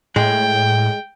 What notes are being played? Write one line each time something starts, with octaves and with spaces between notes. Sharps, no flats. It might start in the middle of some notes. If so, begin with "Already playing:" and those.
A2 G#3 G5